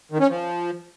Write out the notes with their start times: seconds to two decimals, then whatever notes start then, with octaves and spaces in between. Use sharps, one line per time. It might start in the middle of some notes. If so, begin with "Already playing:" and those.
0.12 D#3
0.20 C#4
0.29 F3